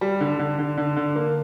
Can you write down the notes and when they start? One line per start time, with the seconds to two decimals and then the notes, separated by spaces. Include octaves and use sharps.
0.01 G3
0.20 D3
0.39 D3
0.59 D3
0.77 D3
0.96 D3
1.16 A#3